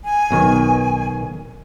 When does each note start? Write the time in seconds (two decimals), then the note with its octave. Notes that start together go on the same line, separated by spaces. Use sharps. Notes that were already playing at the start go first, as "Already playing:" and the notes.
0.04 G#5
0.31 B1 B2 D#3